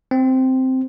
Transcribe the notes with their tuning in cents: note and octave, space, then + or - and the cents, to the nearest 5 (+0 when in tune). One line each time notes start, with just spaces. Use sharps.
C4 -5